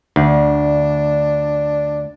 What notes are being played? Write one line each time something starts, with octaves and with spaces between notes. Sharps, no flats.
D2 D4